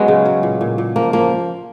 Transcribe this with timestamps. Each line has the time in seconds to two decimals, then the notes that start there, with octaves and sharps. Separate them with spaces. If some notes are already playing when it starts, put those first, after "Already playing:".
Already playing: F#3 G#3 B3 C#4
0.08 C#3
0.25 F#3
0.43 A#2
0.61 A#2
0.78 A#2
0.96 F3 A#3
1.13 F3 A#3